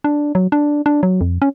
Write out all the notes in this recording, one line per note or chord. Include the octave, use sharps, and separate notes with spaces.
D4
F#3
D4
D4
F#3
F2
C#4